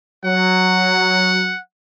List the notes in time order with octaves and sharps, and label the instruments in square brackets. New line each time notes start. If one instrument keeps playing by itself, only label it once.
[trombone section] F#3 [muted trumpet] F#5